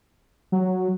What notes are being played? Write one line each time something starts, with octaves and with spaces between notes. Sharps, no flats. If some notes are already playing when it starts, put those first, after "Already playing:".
F#3